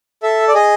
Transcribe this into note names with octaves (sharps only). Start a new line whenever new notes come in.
A4 E5
D5
G#4 D#5